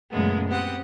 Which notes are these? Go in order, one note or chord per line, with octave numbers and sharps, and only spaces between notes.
F#2 A#2 C#3 G#3 A3 B3
B3 C4 G4 F#5 D#6